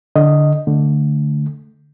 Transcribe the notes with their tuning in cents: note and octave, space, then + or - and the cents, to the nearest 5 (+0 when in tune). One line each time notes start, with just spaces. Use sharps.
D3 +0 D#5 +0
D3 +0 A3 +0